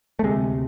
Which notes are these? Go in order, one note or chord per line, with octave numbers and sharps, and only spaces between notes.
A3
D2 C3 G#3